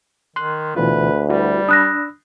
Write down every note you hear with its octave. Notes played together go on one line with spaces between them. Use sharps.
D#3 C6 F#6
D2 B2 E3 F4 B4
G3 E4 F#4 B4
D4 B5 D#6 E6 F#6 A#6